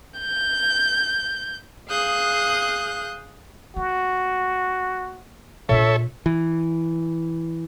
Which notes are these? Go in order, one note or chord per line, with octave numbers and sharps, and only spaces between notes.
G6
G#4 F5 D#6 F#6 G6
A#3 F#4
A#2 D4 A4 C#5 E5
E3